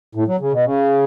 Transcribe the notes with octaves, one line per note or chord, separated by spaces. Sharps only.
A2
F#3
C#3
B2
C#3